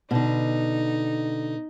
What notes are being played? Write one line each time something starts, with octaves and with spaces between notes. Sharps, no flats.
B2 D3 D#4